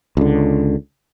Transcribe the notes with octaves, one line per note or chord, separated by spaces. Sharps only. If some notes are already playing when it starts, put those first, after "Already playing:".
C#2 D3